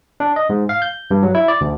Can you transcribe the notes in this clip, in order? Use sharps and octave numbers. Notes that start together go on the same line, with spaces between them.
D4
D#5
G#2
F5
G6
G2
F#3
E4
D5
D2